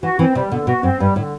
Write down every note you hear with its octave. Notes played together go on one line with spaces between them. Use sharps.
E3 F#4
E3 C4
C3 G3
B2 D3
B2 F#4
F#2 C4
G2 G3
A2 D3